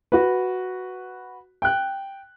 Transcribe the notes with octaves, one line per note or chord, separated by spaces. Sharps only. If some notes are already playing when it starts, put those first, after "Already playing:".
F#4 B4
G5 F#6